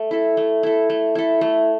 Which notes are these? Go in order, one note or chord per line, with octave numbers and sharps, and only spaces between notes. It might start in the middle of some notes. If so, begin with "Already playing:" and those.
Already playing: A3
E4 A4
A3
E4 A4
A3
E4 A4
A3